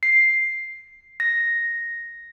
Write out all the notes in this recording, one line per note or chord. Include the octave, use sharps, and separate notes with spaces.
C7
A#6